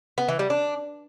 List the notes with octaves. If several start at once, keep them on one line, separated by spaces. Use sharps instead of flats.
B3
E3
G3
D4